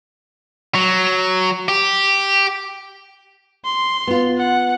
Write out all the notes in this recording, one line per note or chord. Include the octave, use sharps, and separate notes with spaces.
F#3
G4
C6
B3 F4
F#5